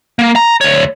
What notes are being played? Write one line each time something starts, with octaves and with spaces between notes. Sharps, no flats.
A#3
A#5
D2 C#5